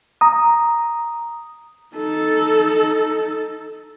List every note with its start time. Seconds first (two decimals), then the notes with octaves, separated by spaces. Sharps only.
0.21 A#5 D#6
1.96 D#4 A4